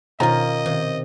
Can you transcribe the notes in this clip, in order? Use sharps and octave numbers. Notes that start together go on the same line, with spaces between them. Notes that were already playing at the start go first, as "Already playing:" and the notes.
B2 D#3 C#4 F4 C5 D#5 A#5
C3 D#3